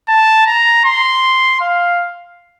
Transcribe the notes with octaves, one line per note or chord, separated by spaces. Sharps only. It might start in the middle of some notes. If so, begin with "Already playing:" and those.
A5
A#5
C6
F5